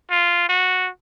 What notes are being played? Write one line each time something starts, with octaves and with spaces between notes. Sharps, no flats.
F4
F#4